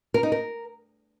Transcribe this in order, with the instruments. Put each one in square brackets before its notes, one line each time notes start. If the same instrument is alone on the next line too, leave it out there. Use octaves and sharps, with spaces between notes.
[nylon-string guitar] A#4
D#4
A#4